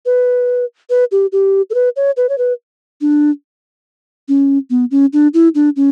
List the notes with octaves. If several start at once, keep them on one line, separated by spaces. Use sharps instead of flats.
B4
B4
G4
G4
A4
B4
C#5
B4
C#5
B4
D4
C#4
B3
C#4
D4
E4
D4
C#4